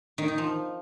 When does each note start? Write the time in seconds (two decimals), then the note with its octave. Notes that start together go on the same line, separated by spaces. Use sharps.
0.18 D#3
0.28 D#4
0.38 F3